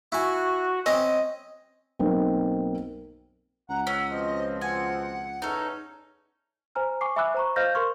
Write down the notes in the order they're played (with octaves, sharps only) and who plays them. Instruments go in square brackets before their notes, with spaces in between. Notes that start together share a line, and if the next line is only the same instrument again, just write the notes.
[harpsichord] E4 G#5 [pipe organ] F#4
[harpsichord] C4 C#4 [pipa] D#5
[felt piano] B1 A#3 C4
[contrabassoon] C#2 [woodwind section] F#5 [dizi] A#5
[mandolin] C#4 [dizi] E6
[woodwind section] B2 F3 C4 [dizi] D#5
[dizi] F#5 [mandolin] G#5
[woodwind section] E2 C#4 [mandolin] D#4 A4
[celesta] C5 G#5 A#5 F6
G#5 C#6 D6 C7
E5 G#5 B5 D6 E6 F#6
C5 A#5 C#6
C5 D#5 F5 F6 G6 A#6
A#4 C6 C#6 F6 G#6